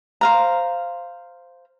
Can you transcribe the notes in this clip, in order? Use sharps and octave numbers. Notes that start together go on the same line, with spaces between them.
C5 F5 A#5